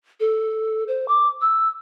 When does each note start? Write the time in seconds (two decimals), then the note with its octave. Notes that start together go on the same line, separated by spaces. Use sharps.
0.20 A4
0.88 C5
1.08 D6
1.41 E6